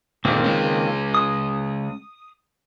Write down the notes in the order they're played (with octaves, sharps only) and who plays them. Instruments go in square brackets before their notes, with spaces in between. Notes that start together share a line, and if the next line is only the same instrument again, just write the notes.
[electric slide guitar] A#2 G#3 [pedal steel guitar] D#3 A#3 C4
[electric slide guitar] G#3 C#4
[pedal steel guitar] D#6